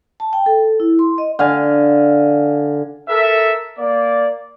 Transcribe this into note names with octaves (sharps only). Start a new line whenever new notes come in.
A5
G5
A4
E4
C6
D#5
D3 F5 G#5
A4 A#4 E5
A#3 D5